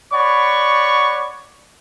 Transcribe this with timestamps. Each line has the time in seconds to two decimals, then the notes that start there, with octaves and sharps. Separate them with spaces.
0.13 C#5 D5 F#5 B5 C#6